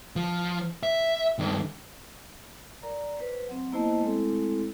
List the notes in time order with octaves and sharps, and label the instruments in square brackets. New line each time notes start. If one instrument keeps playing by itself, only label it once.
[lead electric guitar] F3
E5
G2 D#3
[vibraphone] A#4 D5 A#5
B4 C5
F#3 C4
A#3 B3 E4 C5 D#5 A5
G#3 A3 C4 E4 A4